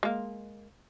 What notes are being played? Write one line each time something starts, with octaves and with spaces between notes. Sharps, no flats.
G#3 A#3